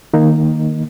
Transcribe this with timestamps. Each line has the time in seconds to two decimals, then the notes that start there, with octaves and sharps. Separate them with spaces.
0.14 D#3 A#3 D#4